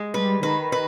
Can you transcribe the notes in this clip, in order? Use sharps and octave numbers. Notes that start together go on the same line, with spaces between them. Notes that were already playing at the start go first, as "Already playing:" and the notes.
Already playing: G#3
G3 B4
D#3 B4
B4